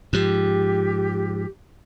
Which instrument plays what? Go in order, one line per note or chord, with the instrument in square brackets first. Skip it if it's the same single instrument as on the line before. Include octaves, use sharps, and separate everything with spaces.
[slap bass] G#2 F3 [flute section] G4